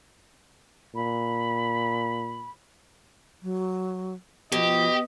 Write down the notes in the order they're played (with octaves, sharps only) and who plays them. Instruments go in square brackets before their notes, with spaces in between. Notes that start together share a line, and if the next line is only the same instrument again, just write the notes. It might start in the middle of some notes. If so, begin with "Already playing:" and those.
[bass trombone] A#2 [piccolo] B5
[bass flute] F#3
[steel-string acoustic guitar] B2 [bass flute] F3 [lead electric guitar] G4 [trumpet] D#5